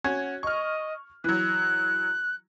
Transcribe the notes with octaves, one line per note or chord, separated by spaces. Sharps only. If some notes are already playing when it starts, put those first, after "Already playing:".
C#4 F#4 G#6
D#5 C#6 F6
E3 F#3 F#6